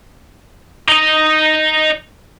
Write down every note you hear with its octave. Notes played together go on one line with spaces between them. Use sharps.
D#4 D#5